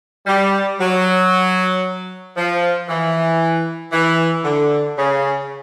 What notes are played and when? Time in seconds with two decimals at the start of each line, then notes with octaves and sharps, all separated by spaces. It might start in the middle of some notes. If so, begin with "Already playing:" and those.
0.27 G3
0.80 F#3
2.36 F3
2.88 E3
3.92 E3
4.44 D3
4.97 C#3